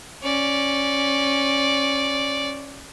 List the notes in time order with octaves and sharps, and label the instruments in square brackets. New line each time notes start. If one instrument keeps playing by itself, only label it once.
[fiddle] C#4 D5